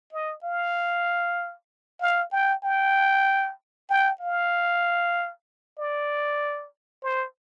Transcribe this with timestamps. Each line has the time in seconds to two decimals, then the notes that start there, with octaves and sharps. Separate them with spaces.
0.13 D#5
0.44 F5
2.01 F5
2.32 G5
2.64 G5
3.90 G5
4.21 F5
5.79 D5
7.03 C5